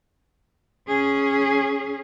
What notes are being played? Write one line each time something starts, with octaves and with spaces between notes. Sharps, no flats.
C#4 G#4